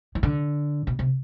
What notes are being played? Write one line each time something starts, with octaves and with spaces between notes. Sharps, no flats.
E3
D3
B2
C3